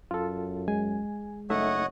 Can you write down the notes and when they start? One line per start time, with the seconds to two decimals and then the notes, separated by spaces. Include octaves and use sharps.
0.11 F#2 F4 A4
0.68 G#3 G#5
1.50 F#1 A3 D#4 C#5 D#5 E5 F#5